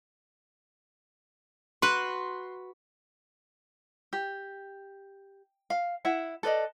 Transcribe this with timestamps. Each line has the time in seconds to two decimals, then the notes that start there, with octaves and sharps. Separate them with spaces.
1.82 F#4 B4 C6
4.13 G4
5.70 F5
6.05 E4 E5 F#5
6.43 A4 B4 D5 D#5